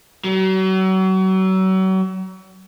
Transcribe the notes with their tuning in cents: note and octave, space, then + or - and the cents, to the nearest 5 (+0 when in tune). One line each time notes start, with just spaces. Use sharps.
F#3 +35